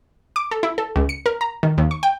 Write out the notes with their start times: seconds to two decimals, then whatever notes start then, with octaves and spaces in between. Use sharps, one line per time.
0.36 D6
0.51 A4
0.63 E4
0.78 A4
0.96 C#2
1.09 C#7
1.26 A#4
1.41 A#5
1.63 D#3
1.78 D#2
1.91 C#6
2.03 G5